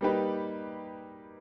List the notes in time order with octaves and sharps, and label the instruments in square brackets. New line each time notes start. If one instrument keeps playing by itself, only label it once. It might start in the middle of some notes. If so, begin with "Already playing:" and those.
[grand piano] G3 A#3 D#4 G4 B4